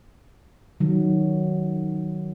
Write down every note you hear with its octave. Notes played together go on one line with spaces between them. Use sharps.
D#3 F#3